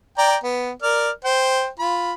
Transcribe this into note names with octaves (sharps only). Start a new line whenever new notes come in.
D5 G5 A#5
B3
A#4 D5 F6
C5 G5
F4 B5